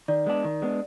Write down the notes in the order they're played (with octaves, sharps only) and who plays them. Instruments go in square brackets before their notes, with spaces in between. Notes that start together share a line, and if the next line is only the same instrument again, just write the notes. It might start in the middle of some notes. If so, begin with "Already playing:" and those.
[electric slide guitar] D#3 [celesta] D5
[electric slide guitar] G#3 B3 D4
D#3
G#3 B3 D4